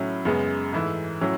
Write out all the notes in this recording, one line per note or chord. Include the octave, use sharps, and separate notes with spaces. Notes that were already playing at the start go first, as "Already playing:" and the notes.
Already playing: A2 F#3 C#4 E4
F#2 C#3 G#3 B3
G#2 E3 A3 E4
A2 F#3 C#4 E4